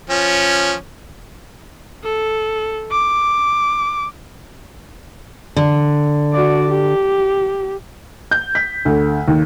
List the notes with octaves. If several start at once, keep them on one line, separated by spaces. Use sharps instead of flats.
F3 C#4
A4
D6
D3
F#4 D5
G4
G6
B6
D2
D#2